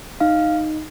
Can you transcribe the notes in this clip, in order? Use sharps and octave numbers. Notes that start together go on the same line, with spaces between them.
D#4 F5